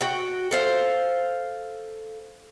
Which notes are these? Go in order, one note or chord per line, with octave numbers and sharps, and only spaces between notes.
F#4 G5
A4 C5 F5